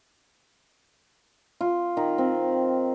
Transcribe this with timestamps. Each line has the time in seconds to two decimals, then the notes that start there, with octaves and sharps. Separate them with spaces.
1.61 F4
1.97 D#3
2.18 C4